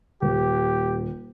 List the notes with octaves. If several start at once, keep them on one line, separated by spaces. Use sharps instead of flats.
D#1 G4